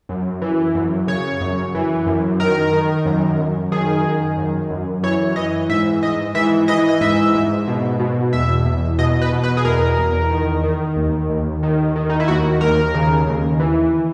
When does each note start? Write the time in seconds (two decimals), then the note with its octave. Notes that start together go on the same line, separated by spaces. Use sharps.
0.09 F#2
0.42 E3
0.75 F#2
1.07 C#3 C#5
1.41 F#2
1.75 E3
2.06 F#2
2.39 D#3 A#4
2.73 D#3
3.05 F#2
3.39 F#2
3.72 D#3 G#4
4.04 D#3
4.38 F#2
4.70 F#2
5.03 E3 C#5
5.36 E3 D#5
5.69 G#2 E5
6.03 G#2 D#5
6.35 E3 E5
6.68 E3 D#5
6.89 D#5
7.01 G#2 E5
7.34 G#2
7.67 B2
7.99 B2
8.33 E2 E5
8.65 E2
8.99 B2 D#5
9.21 B4
9.32 B2
9.43 B4
9.57 G#4
9.64 E2 A#4
9.98 E2
10.31 D#3
10.63 D#3
10.96 D#2
11.29 D#2
11.63 D#3
11.96 D#3
12.10 D#4
12.20 E4
12.28 D#2 F#4
12.61 D#2 A#4
12.94 C#3
13.28 D#2
13.60 E3